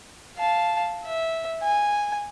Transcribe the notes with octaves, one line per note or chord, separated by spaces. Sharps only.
F5 A5
E5
G#5